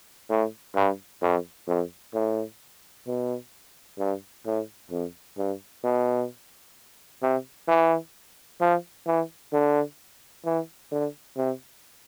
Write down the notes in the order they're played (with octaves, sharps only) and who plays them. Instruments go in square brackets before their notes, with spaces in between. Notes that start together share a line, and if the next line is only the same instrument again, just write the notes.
[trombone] A2
G2
F2
F2
A2
B2
G2
A2
F2
G2
B2
C3
E3
F3
E3
D3
E3
D3
C3